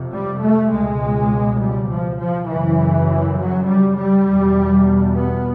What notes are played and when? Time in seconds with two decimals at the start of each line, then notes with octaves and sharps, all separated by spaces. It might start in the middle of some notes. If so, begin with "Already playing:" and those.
Already playing: F2 C3
0.12 G3
0.42 A3
0.71 C#2 B2 G#3
1.61 G3
1.90 F3
2.19 F3
2.48 F#2 C#3 E3
3.38 F#3
3.67 G3
3.97 G3
4.27 E2 B2
5.16 B3